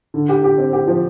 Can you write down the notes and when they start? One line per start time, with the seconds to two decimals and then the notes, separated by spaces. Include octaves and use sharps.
0.14 D3
0.29 G4
0.44 G4
0.58 C4
0.73 G4
0.87 F3